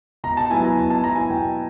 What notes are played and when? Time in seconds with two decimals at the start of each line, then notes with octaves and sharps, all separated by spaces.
0.24 B2 A#5
0.37 A5
0.50 F#3 B3 E4 G#5
0.64 A#5
0.77 B2
0.90 A5
1.03 F#3 B3 E4 A#5
1.16 G#5
1.30 B2 G5